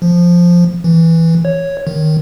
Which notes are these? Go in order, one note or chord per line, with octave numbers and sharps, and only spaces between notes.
F3
E3
C#5
D#3